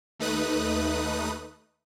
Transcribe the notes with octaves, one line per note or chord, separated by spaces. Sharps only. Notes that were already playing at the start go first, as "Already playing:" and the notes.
D#2 A3 D#4 B4 D#6 F#6